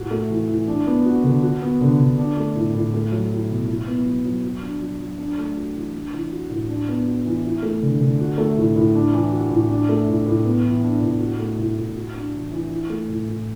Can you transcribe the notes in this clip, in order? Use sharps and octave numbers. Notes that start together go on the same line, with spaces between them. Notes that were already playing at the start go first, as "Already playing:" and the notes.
Already playing: A2 F#4
A3
E3
E3
D4
B3
F#4
D3
F#4
B3
D3
D3
D4
A3
A2
A2
A3
F#3
E4
B2
E4
B3
F#3
F#3
F#4
D4
F#3
F#3
D4
A3
F#4
E3
D4
E3
F#4
A2
D4
B3
F#4
E3
E4
A3
D3
D3
F#4
A3
A2
A2
D4
E3
F#4
A2
D4
A3
A2
A2
B3
E3
D4
A2
F#4
A3
A2
A2
F#4
D4
E3
E3
E4
A3
A2
A2